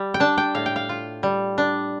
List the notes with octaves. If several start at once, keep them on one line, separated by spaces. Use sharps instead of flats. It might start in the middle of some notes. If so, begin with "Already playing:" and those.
Already playing: G3
G5
D4 A5
G5
A2 F5
G5
F5
F4
G3
D4